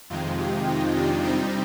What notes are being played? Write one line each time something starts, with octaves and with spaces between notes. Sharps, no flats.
F2 C3 D#3 G#3 C4 F4
G4
D#4
D4
C3 G3 C4 D#4